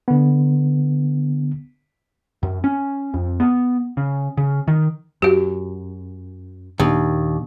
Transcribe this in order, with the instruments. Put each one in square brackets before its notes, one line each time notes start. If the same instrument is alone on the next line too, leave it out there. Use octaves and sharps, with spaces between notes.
[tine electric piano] D3 B3
[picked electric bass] F#2
C#4
F2
B3
C#3
C#3
D#3
[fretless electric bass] F#2 [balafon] F#4 G4
[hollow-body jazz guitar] D#2 [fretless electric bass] A#2 D4